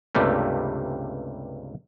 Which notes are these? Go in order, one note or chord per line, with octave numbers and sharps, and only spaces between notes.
C#2 G2 C3 G3 A3 A#3